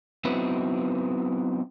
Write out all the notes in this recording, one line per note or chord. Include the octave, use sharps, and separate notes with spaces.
F#3 B3 C4 D#4 E4 B4